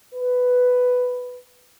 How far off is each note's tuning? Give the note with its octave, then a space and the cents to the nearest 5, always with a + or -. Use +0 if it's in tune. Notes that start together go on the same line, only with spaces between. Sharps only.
B4 +5